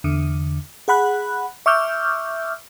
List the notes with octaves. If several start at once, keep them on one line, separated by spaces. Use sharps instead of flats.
E2 D3
G#4 F#5 B5 F#6
E5 C#6 D6 E6 F6 G6